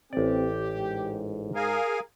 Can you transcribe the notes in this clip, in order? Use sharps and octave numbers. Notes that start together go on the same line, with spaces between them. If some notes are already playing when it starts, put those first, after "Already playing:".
A1 C4 G4 D5
G#2
G#4 A#4 F5 G#5